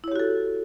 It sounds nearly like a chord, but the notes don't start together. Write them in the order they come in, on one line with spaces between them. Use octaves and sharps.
E4 C#5 G4 F#4 A4